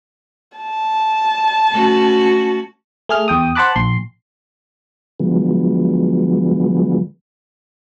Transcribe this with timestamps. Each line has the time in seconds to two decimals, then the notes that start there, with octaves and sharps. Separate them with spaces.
0.58 A5
1.71 A3 C#4 F#4
3.09 A3 G#4 F6
3.28 E2 G5 D#6
3.55 C5 F#5 A5 B5 D6 F#6
3.76 A#1 C6
5.20 D3 F3 F#3 G#3 B3